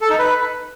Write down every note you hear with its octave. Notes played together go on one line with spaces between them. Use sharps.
A4
D#4
B4